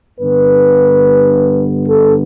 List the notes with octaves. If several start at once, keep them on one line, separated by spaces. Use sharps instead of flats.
G2 D3 B3 B4
A4